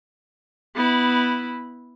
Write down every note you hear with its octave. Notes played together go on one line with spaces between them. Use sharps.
B3 E4